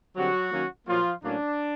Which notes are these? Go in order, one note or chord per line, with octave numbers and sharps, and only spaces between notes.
D3 F#3 G3 C4 F#4
D#3 F#3 A#3 C#4
A#2 F3 F#3 A#3 F4
A2 F#3 A#3 C#4 D4